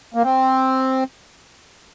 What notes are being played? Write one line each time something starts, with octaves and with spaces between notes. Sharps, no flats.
A#3
C4